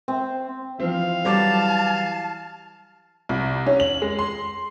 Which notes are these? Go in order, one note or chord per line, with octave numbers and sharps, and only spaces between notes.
C4
E3 F3 C4 F5
F#3 G3 A5 D6
C2
C#4
F#7
G#3
C6